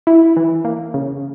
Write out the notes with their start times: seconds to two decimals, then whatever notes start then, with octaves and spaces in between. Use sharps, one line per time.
0.07 E4
0.37 E3
0.65 A#3
0.94 C#3